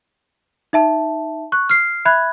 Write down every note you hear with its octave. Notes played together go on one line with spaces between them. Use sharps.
D#4 E5 A5
C#6 F#6
F6 C7
E5 B5 F#6 G#6